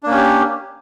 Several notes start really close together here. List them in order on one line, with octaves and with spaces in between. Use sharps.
D4 A#3 C#4 G4